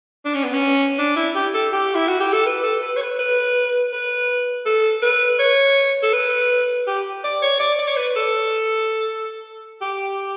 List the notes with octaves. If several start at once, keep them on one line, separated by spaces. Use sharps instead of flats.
D4
C#4
B3
C#4
D4
E4
G4
A4
G4
E4
F#4
G4
A4
B4
A4
B4
C#5
B4
B4
B4
A4
B4
C#5
A4
B4
G4
D5
C#5
D5
D5
C#5
B4
A4
G4